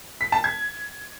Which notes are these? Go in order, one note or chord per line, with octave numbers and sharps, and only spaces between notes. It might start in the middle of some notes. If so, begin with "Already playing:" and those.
B6
A5
G#6